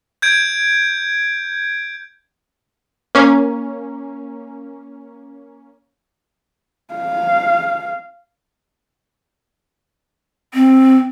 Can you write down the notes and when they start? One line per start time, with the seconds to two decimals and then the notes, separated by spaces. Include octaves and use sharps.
0.22 G6 G#6 D7
3.15 A#3 C#4
6.94 F5
10.54 C4